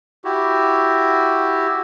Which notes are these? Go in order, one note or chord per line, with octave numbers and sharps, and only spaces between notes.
E4 F#4 G4